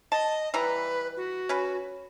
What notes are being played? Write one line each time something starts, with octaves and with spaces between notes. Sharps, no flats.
D#5 A5
E3 G3 B4 A#5
F#4
C#4 B4